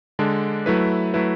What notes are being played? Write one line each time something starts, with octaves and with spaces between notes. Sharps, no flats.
D3 G#3 D4
F#3 A3 E4 B4
F#3 A3 E4 B4